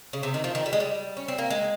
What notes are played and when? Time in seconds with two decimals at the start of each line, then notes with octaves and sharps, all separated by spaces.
0.13 C#3
0.23 C3
0.34 D#3
0.44 F3
0.55 D#3
0.66 G3
0.73 G#3
0.80 G3
1.17 C#4
1.28 C4
1.38 A#3
1.50 G#3